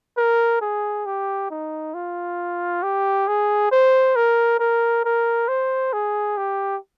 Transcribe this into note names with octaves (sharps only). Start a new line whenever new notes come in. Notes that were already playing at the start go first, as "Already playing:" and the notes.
A#4
G#4
G4
D#4
F4
G4
G#4
C5
A#4
A#4
A#4
C5
G#4
G4